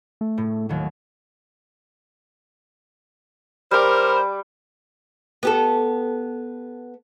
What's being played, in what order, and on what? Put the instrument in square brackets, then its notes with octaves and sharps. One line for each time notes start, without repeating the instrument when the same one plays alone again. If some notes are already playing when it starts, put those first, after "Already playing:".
[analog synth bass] A3
[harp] A2
D#2 D#3 F#3
[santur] G3 D6 [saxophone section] A#4 C5
[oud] B3 G4 A4